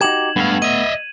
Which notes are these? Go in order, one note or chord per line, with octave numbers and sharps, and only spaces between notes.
D#4 F#4 G4 G#6 E7 F#7
G2 A3 B3 F5
D#5 E5 D#7